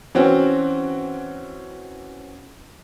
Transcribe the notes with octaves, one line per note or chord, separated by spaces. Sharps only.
E3 C4 C#4 F#4